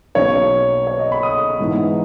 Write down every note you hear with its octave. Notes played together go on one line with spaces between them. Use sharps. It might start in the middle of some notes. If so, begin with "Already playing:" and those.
B1 B2 A#3 C#4 C#5
C#5
D#5
B5
D#6
G#2 E3 G#3 B3 D#4